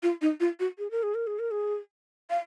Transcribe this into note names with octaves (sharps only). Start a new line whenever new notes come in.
F4
D#4
F4
F#4
G#4
A#4
G#4
A#4
G#4
A#4
G#4
F5